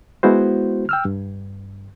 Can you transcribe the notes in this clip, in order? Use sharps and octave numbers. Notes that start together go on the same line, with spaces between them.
G#3 B3 E4 F#4 C5
G5 E6 F6
G2